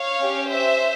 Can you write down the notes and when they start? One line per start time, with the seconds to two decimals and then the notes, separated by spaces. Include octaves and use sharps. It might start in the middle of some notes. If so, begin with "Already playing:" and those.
Already playing: C#5 F5
0.21 C#4 G4
0.49 C5 E5